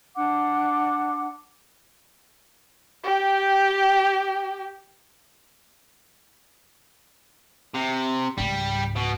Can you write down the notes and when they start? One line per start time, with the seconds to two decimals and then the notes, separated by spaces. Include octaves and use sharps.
0.15 D4 F#5 D6
3.04 G4 G5
7.74 C3
8.38 C#2 G#2 G3
8.96 B2